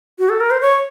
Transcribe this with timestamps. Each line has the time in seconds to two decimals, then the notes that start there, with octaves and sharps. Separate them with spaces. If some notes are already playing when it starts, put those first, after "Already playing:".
0.19 F#4
0.29 A4
0.40 A#4
0.51 C5
0.61 C#5